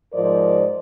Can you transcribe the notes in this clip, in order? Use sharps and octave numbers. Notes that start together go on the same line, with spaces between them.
G#2 F3 A#4 C5 D5 D#5